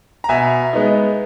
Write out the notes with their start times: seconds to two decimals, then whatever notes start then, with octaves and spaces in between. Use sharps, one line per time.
0.24 A#5
0.29 B2 E5 G#5
0.73 G#3 B3 D#4